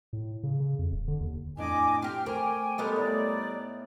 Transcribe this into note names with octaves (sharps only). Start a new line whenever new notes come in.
A2
C#3
C#3
F2
D#1
D3
D#2
F2 A2 D4 D#5 G#5 D6
C4 G4 G5 F6
A3 A#4 C5 G5 G#5 D6
G3 G#3 B3 A4 A#4 B5
A2 D#4 D5